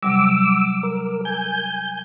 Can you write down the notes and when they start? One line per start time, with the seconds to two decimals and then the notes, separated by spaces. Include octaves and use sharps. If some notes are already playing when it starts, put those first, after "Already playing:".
0.03 C3 F#3 G3 D6 E6
0.83 A#4
1.25 G#5 G6